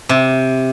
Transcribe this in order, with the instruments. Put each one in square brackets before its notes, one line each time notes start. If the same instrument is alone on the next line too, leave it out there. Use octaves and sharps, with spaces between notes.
[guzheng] C3